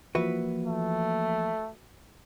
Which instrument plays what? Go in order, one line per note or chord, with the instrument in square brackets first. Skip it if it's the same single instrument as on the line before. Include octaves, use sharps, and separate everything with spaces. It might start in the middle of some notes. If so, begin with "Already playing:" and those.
[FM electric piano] E3 F3 A#3 [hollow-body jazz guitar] F#4 B4 E5
[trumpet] A3